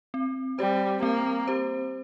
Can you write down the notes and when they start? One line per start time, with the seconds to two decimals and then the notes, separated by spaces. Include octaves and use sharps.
0.14 C4
0.59 G3 G4 C5
1.03 A#3 C4
1.48 G4 C5